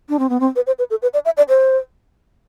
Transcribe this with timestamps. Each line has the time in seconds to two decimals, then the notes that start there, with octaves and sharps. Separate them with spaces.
0.09 D4
0.19 C4
0.29 B3
0.40 C4
0.56 B4
0.67 C5
0.79 B4
0.90 A4
1.02 B4
1.14 D5
1.25 E5
1.37 D5
1.49 C5